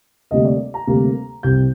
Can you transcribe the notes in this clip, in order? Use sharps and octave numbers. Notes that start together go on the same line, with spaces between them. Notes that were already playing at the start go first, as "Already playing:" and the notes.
D2 C3 G3 A#3 D#5
D5
A#5
D2 C3 G3 A#3
C2 C3 G3 C4 G6